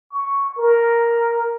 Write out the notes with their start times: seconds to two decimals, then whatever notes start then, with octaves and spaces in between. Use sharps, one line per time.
0.12 C#6
0.57 A#4